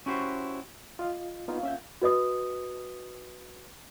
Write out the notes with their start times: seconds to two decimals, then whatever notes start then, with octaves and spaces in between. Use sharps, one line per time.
0.06 C#4 E4 F#4 G4 C5
0.99 F4 D#5 F5
1.48 A#2 B3 C#4 D#4 F4 F5
1.63 C#4 F#4 G#4 E5 G6
2.02 F#4 B4 D#5 D#6